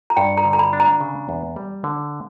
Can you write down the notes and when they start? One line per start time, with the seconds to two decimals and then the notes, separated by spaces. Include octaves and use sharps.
0.10 A#5
0.17 G2 G5
0.37 A#5
0.45 D3
0.53 A#5
0.59 B5
0.73 D4
0.80 A#5
1.00 C#3
1.29 E2
1.56 G3
1.84 D3